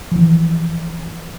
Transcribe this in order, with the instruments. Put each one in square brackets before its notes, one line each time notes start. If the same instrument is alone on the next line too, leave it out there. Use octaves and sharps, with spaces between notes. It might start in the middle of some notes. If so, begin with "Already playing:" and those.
[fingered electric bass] E3 F3